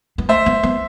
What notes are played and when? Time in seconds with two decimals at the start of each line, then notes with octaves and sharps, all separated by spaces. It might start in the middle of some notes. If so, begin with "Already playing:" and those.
0.18 B3
0.29 A3 C5 E5
0.46 B3
0.63 B3